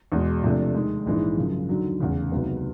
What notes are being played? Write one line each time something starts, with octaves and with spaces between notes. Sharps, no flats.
E2 B2 G#3
C3 F3 A3 D4
D#2 D#3 G#3
A#1 G#2 E3 G#3
F#2 C#3 F3
D#2 D3 F#3
F1 E2 C#3
C#2 C3 D#3 F#3 B3